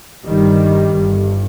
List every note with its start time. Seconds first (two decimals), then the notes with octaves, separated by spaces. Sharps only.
0.25 G1 G2 D#3 G3
0.92 G1 G2